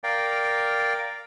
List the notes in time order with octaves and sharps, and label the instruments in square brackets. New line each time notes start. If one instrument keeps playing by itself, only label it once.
[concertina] A#4 D5 F5 G5